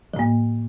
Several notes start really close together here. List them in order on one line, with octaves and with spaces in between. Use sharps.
F3 A2 A#3